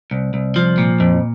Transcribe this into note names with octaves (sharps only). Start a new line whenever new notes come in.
C2
C2
F3
A#2
F2